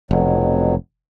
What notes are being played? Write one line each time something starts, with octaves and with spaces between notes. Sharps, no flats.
F1 F2 B2 F#3